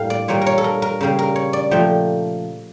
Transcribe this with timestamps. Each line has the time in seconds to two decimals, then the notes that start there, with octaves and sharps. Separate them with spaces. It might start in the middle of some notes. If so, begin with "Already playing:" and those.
Already playing: A2 G3 A#3 F5 G5
0.10 D5
0.28 A#2 G3 A#3 C#5
0.41 A#4 C#5
0.58 A4
0.64 A#4
0.82 A#4
1.01 C#3 G3 A#3
1.19 A#4
1.36 C#5
1.53 D5
1.71 A#2 F3 A3 G5